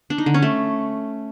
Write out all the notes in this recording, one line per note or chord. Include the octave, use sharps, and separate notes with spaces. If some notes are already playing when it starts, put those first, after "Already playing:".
D4
D#4
D3
C#4
A3